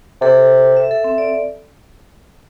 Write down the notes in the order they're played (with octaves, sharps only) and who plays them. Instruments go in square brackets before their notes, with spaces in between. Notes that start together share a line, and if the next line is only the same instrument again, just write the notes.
[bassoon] C3 [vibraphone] A4
[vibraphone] E5
A4
C4
D5